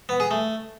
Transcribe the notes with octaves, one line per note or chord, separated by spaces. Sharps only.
B3
G#4
A3